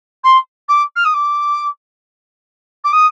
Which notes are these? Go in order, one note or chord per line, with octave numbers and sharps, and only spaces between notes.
C6
D6
F6
D#6
D6
D6
D#6